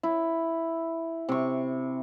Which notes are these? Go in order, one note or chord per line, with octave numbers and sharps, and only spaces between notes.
E4
C3 C#6